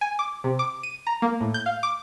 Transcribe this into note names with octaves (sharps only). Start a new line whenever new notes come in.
G#5
D6
C3
D6
D#7
A#5
A#3
A2
G6
F5
D6